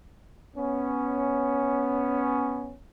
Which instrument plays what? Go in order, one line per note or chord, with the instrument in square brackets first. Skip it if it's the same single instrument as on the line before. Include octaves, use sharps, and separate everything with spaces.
[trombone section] B3 C#4